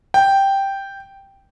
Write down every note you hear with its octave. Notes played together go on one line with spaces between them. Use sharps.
G5